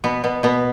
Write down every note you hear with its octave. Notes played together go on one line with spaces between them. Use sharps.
B2 B3
B2 B3
B2 B3